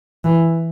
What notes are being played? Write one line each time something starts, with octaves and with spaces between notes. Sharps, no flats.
E3